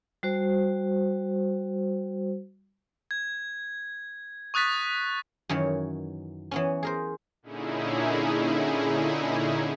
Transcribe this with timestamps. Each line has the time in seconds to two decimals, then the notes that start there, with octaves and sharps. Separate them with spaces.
0.23 G3 F#4 C5
3.11 G#6
4.54 C#6 D#6 F#6 A6 B6
5.49 F#2 D#3 E3 C#5
6.51 E3 B3 C#4
6.83 G#4 A#4 C5
7.42 A#2 D3 C#4 D#4 E4 G#4